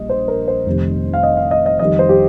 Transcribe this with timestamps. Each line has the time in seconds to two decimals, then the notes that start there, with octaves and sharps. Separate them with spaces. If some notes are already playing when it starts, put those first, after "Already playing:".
Already playing: A#1 A#2 G3 D#5
0.10 C5
0.28 A#4
0.48 C5
0.66 F1 F2 C3 D#3 G3
1.14 F5
1.23 D#5
1.37 F5
1.51 D#5
1.66 D#5
1.79 F2 D#3 G3 D#5
1.99 C5
2.09 G4